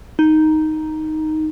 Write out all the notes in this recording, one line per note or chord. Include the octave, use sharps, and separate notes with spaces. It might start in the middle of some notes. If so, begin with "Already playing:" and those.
D#4